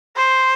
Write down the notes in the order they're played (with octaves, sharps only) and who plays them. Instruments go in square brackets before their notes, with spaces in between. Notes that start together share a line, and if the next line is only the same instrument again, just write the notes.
[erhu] C5